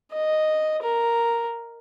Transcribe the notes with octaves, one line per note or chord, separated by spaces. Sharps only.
D#5
A#4